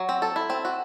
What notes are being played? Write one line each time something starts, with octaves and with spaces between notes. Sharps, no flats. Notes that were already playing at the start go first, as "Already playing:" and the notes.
Already playing: F#3
C4
A4
E4
C4
F#4